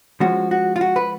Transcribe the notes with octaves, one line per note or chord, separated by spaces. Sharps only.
F3 G#3 C#4 F#4
F#4
F4
F#4
B4